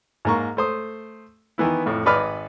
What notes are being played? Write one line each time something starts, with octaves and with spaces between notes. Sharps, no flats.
G#2 A#3 C#6
A3 C5 D#6
D#3 E3 B3 E4
F2 A2
G#1 B4 D5 D#5 B5 F6